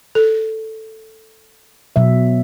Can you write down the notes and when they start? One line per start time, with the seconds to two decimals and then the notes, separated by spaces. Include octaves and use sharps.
0.15 A4
1.96 B2 F#3 E5